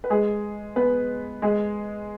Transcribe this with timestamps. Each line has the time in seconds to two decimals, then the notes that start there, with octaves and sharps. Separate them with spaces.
0.04 B4
0.10 G#3 G#4
0.76 B3 B4
1.42 G#3 G#4